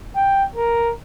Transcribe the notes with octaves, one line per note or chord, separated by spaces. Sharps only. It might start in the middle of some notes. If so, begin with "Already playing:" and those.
G5
A#4